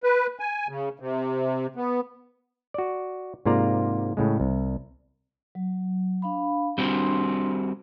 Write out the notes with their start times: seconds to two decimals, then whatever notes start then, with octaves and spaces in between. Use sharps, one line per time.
0.03 B4
0.39 G#5
0.69 C#3
1.00 C3
1.76 B3
2.74 F#4 D5
3.45 G#2 C3 A#3 F4 D5 A#5
4.17 A2 C#3 G#3
4.40 C2
5.55 F#3
6.22 D4 F5 B5
6.78 G3 C4 D4 F#4 C6